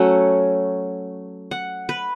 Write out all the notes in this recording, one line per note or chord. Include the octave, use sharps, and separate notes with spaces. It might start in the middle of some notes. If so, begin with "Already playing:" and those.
Already playing: F#3 A3 C#4 F#5
F#5
B4